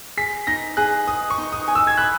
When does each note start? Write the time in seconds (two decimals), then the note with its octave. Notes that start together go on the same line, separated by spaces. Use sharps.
0.17 G#4 B6
0.47 D#4 A#6
0.77 G#4 F#6
1.07 D#5 D#6
1.30 C#6
1.38 D#4
1.52 D#6
1.68 G#5
1.75 E6
1.87 G#6
1.97 B5 F#6